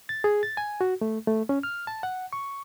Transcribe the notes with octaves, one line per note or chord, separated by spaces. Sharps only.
A6
G#4
A6
G#5
F#4
A3
A3
C#4
F6
A5
F#5
C#6